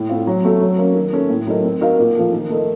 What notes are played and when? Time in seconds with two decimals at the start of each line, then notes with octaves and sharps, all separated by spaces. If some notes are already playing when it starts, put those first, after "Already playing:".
Already playing: A2
0.09 A3 C4 F4
0.27 F#3
0.45 A3 C4 F#4 A4
0.61 F#3
0.79 A#3 C#4
0.95 D#3
1.13 A3 C#4
1.30 A2
1.47 F#3 A3 D#4 A#4
1.64 C4
1.81 D#4 F#4 A#4 F5
1.99 A#2
2.16 F3 A3
2.33 D#3
2.49 A3 D#4 A#4 D#5